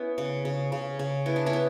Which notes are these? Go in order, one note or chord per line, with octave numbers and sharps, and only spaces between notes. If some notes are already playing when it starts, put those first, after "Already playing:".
Already playing: B3 C#4 E4
C#3
C#3
C#3
C#3
B3 E4
D4
C#4 E4
B3